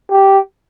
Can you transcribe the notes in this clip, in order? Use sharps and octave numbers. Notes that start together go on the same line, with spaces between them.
G4